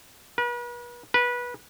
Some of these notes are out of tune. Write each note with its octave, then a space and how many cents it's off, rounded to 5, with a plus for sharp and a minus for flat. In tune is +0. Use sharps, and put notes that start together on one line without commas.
B4 -40
B4 -20